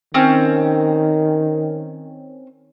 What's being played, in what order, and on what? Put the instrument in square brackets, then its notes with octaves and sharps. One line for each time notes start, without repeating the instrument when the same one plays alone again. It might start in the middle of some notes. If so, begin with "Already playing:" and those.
[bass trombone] D#3 [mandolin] C4 C#4